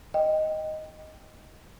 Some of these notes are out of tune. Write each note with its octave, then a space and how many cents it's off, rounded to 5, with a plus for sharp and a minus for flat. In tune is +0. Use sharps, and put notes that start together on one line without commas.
D#5 +0 G5 +0